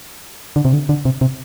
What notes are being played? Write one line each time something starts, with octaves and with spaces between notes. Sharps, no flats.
D3
C3
D3
D3
C3
C3